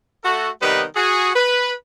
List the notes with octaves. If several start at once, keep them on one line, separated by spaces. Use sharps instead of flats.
A3 F#4 A4
C3 D#3 G3 B3 D#4 B4
F#4 G#4
B4